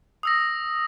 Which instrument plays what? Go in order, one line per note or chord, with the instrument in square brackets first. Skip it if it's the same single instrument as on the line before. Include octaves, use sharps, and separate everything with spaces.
[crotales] D#6 E6 A#6